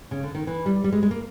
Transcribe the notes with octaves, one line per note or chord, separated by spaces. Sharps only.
C#3
D3
D#3
E3
G3
G3
G#3
G#3
A#3